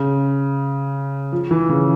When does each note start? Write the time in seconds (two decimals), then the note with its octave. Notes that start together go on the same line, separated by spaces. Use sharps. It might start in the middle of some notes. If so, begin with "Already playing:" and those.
Already playing: C#3
1.32 F3
1.51 E3
1.69 C#3